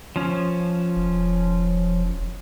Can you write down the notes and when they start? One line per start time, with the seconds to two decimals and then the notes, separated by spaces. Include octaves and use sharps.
0.16 F3 C#4
0.97 E1